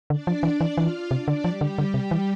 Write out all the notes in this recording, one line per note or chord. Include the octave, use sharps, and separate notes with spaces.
D3 D4 D5
F3
E3
E3
E3 F4 F5
C3 D4 D5
D3
F3 G3 G4
D3
D3
C3
E3